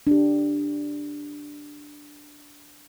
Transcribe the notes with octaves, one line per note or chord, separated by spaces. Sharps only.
D4 G4